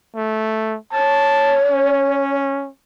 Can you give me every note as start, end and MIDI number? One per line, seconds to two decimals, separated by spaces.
0.15 0.77 57
0.92 2.37 73
0.92 1.58 81
1.71 2.69 61